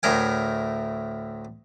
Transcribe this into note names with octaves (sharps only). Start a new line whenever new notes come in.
D2 A2 A#4 G#5